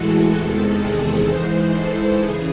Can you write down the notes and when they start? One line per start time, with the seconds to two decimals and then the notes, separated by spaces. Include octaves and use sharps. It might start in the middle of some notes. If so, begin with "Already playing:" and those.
Already playing: A2 E3 G#3 F#4 A4
0.37 E2 C3 D#3 G#3 A4
0.82 G#4
1.28 G#2 E3 G#3 C5
1.73 A4
2.19 C#3 E3 G#4